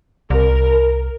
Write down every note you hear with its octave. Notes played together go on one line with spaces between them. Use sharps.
C2 A#4